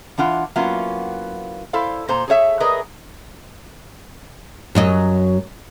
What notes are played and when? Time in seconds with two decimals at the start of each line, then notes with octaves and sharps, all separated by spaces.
0.18 E3 D4 F4 F#5
0.56 F#3 A#3 B3 C#4 E4 F4
1.73 E4 A4 C5 D5 F5
2.08 A#2 C5 A#5
2.28 G#4 A4 C#5 E5
2.60 G#4 A#4 B4 D5 D#5
4.75 F#2 F#3 D#5